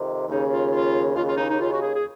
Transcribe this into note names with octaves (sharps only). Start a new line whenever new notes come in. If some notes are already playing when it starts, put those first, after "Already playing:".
Already playing: F2 C3 D#3
D#2 C#3 D#4
F4
F4
D#2 C#3 F4
F4
D#4
D#4
F4
F#4
G#4
G#4